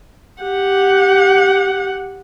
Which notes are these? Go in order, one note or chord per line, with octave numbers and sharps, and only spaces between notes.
G4 F#5